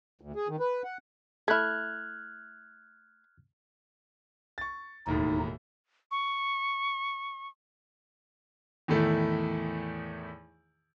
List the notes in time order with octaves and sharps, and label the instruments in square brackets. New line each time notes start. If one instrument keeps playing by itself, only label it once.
[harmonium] D2
G#4
D#3
B4
F#5
[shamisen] A3 E4 [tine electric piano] F6 F#6 G#6
[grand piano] C#6 A6
[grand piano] E1 D#2 A2 [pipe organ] D#4
[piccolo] C#6
[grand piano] E2 A2 D#3 A3 E4